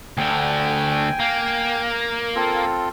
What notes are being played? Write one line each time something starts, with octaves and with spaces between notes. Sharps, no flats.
D2 D3 G5 G#5
A#3
C4 F4 A4